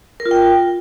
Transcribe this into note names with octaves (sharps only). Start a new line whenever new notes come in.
A#4
F4
G5